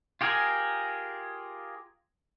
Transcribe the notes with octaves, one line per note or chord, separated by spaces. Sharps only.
F4 G4 G#4 A#4 G#5